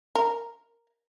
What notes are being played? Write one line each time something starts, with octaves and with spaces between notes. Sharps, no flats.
A#4